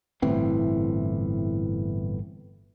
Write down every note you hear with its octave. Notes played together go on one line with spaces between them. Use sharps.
G1 A2 E3 C4